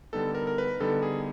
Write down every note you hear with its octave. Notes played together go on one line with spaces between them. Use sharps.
D3 G3 B3 D#4 A4
A#4
A#4
B4
D3 G3 B3 D#4 A4
G#4